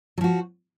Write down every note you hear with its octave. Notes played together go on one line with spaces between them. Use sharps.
F3 F#3 F#4